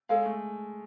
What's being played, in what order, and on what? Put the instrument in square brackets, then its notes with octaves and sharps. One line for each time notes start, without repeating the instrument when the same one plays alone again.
[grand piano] G#3 [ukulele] A4 C#5 F5
[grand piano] A3